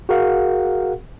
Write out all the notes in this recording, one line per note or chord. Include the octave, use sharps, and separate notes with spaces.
F#4 G#4 A#4 F5 F#5